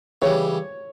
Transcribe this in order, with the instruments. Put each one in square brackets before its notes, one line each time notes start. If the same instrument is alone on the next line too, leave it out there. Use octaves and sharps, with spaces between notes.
[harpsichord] C#3 E3 G3 [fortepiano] C#5